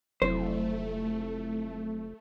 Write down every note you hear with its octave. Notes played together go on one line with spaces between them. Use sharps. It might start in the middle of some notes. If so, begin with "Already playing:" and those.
F1 F#3 A3 C4 E4 C5